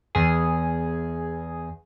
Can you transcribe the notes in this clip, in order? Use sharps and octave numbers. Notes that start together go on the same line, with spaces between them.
E2 G#4